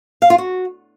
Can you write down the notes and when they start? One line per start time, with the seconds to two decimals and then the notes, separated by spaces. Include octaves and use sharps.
0.22 F5
0.30 F4
0.38 F#4